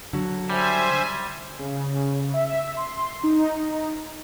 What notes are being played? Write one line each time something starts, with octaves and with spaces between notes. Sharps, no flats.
D3 F#3
G3 C5 E5 G#5
C#3
E5
C6
D#4